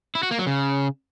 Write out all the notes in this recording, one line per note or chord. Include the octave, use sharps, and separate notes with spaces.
E4
F#4
A#3
F#3
C#3